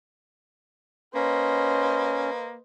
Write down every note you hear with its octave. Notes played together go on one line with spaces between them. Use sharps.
A#3 C#4 B4 C5 D#5